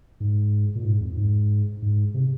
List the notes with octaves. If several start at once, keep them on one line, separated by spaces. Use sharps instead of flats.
G#2
A#2
G#2
F2
G#2
G#2
C3